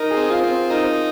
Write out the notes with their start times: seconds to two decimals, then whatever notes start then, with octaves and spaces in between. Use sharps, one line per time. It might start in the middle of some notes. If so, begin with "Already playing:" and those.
Already playing: D#4 A#4
0.11 G#4
0.17 C4
0.30 F4
0.44 C4
0.70 D#4 A#4